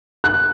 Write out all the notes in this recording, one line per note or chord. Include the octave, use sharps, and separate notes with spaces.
F#6